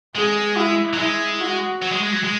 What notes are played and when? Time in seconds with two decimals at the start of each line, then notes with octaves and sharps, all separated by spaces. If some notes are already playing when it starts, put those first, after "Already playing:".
0.15 G#3 G#4
0.57 E4
0.93 F#3
0.99 G#3 E4
1.40 F#4
1.82 F#3
1.92 G#3
2.03 G#3
2.12 F#3
2.24 G#3